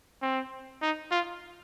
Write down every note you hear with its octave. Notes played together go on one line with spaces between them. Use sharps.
C4
D#4
F4